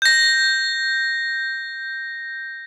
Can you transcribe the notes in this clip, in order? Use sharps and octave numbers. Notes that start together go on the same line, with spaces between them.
G6 A#6